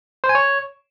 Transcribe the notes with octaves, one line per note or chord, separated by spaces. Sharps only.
C5
G#5
C#5